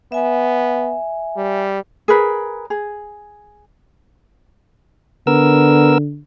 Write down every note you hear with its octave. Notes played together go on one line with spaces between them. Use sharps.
B3 E5 G#5
G3
G#4 A#4 B4
G#4
D3 B3 A#4 E6